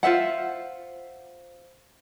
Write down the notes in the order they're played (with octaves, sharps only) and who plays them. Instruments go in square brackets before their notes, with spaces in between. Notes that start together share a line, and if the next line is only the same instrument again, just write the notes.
[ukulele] F4 C5 E5 F#5